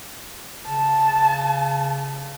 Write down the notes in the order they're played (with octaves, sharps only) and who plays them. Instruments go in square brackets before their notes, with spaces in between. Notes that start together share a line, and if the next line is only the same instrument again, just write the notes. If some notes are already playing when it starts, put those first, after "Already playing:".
[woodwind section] C#3 [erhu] A5